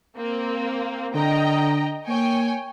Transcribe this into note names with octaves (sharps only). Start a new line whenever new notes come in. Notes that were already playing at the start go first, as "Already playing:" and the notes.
A#3 C4
D3 D#5 G5 A#5
A#3 C#5 G5 G#5